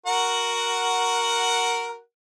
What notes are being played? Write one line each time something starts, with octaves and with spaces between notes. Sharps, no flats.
F#4 A#4 F#5